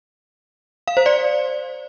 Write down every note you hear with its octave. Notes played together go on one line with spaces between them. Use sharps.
F5
C5
D5